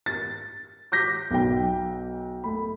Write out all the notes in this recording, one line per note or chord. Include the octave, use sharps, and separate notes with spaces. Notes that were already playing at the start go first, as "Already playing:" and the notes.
A6
D6 G6 A#6 B6
B1 G5
A3 B5